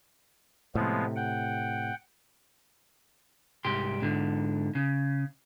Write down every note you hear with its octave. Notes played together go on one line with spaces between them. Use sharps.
A2 C3 F3 G#3 B3
F#5 G5
C2 G#2 G4 C6
G#2 D3
C#3